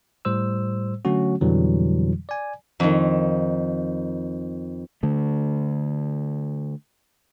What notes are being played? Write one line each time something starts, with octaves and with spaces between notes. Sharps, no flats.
A2 G3 C5 E6
D3 F#3 A3 C#4 F#4
F2 B2 D3 E3 F#3 G3
D5 G#5
F2 D#3
D3 A3